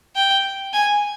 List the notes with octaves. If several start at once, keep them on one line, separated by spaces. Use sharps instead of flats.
G5
G#5